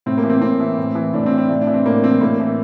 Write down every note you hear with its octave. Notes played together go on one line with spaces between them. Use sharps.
A2 C4
A#3
E3
C4
A2 C4
E3
A2
E3
A2 D4
C4
E3
C4
A2 D4
D4
E3
C4
A2 A#3
E3 C4
A2 A#3
E3